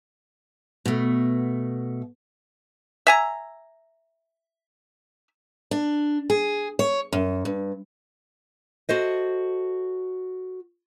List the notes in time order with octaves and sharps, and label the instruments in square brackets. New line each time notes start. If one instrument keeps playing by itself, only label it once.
[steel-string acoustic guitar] B2 A3
[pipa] E5 G#5 A#5
[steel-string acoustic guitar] D4
G#4
C#5
F#2
G2
[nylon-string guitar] F#4 A4 C5 D#5